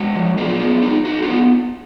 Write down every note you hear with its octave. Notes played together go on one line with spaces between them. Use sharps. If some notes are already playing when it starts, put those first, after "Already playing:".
Already playing: G#3 F#4
F3
F#3 F4 G#4
B3
D#4
D#4 F#4
F4 G#4
B3